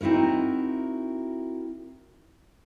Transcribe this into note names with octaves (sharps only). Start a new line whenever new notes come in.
C4 D#4 E4 F#4 A#4